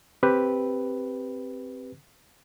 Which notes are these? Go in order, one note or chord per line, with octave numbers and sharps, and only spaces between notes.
C4 G4 B4